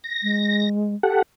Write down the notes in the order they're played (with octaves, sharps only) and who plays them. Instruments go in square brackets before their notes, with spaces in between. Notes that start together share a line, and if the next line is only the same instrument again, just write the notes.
[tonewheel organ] A#6
[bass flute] G#3
[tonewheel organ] G4 A4 F#5